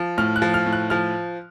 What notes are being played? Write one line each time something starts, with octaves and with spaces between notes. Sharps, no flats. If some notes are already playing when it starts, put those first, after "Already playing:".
Already playing: F3
A2 F6
F#6
F3
F6
A2
F#6
F3 F6